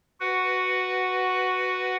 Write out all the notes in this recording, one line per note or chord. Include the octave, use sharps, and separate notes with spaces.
F#4 B4 F#5